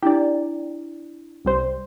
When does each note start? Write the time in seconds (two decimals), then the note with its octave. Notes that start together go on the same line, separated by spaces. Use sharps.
0.03 D4 E4 G4 D5
1.45 C2 G3 C5